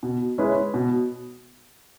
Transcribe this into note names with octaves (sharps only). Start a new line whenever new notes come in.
B2
G#3 C#4 E4 B4
B2